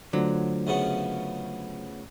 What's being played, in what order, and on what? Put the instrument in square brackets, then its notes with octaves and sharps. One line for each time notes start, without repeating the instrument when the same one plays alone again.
[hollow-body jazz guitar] D3 F#3 [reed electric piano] A3 F4 C5
[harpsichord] F#2 C#3 B3